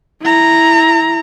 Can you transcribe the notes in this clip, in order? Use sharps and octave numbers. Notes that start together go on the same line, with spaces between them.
E4 A#5